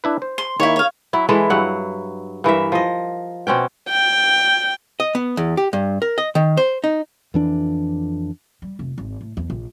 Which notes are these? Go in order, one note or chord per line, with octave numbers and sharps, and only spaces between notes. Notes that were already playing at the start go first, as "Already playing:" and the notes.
D4 E4 B4
C5
C6
D#3 A#3 E4 C#5
C#5 F5
F#3 E4
E3 G#3 E4 A4
G2 F#3 F#5
G2 E3 A#4 E5
F3 D#5
B2 C4 C#4 G5
G5
D#5
B3
E2
G4
G2
A#4
D#5
D#3
C5
D#4
F2 E3 D4
G3
F1
G#1
A2
E2
A#1